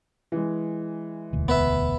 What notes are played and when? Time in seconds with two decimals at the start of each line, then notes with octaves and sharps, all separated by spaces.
0.32 E3 G#3
1.33 E1 D2
1.48 B3 B4 E5